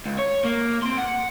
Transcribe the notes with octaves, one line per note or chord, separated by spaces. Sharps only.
C#2
C#5
A#3
C4 C6
F#5